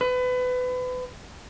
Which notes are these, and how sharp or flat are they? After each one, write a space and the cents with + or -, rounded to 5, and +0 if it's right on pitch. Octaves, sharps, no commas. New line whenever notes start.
B4 +30